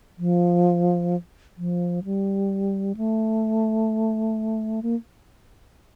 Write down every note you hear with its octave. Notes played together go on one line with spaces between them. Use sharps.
F3
F3
G3
A3
A#3